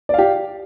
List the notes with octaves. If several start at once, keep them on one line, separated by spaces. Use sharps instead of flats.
G4 D5 F5